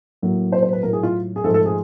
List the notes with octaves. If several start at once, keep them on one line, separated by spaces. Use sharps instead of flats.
A2 F#3 A#3
C5
C5
B4
A2 F#3 A3 A#4
G#4
F4
G#4
G#2 F3 A3 A4
A4
G#4